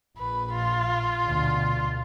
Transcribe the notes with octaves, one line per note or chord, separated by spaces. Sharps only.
A#1 B4
F4
D2 B2